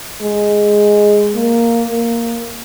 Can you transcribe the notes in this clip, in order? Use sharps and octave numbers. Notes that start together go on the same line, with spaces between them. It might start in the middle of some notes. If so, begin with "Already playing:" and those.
G#3
A#3
A#3